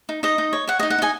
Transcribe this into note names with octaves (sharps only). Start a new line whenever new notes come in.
D#4
D#4 D#5
D#4
C#5
C#5 F#5
D#5
D#4
F#5
D#4 D#5 G#5